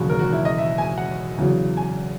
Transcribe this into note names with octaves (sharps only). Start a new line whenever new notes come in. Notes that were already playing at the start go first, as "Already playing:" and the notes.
Already playing: E1 D#2 C#3 F#3 F#4
A#4
F#4
E4
D#5
E5
G#5
F#5
E2 C#3 F#3
G#5